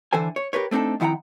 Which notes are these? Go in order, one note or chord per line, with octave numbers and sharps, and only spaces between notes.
D3 E3 A4 C5 G#5
C#5
G4 A#4 B4 C#5
A3 C4 D4 D#4 A4
F2 D#3 E4 F#5 G5 A#5